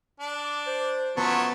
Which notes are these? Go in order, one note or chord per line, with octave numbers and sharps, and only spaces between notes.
D4
D6
C5
F3 F#3 A3 B3 A5